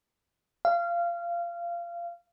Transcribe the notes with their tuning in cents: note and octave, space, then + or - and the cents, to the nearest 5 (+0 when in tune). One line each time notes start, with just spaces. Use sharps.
F5 -20